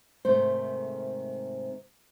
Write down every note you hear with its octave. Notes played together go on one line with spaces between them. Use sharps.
G#2 C3 D#3 A3 C5